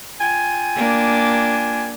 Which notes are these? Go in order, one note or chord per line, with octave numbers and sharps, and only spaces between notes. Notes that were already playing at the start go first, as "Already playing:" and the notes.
F4 G5 G#5
A#3 D4